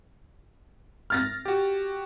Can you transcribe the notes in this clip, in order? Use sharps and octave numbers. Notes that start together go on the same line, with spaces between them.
F6 A6 A#6
F#4 G4